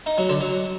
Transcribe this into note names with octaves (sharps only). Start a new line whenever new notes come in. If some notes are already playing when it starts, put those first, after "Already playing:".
D#4
F#3
D3
F#3